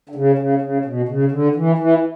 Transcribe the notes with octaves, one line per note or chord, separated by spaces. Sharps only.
D3
C#3
C#3
C#3
B2
C#3
D3
E3
E3